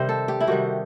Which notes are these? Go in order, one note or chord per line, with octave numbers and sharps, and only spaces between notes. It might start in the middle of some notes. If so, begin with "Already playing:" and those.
Already playing: C3 D#3 G3 C5
A4
G4
E4
C3 D#3 G3 F#4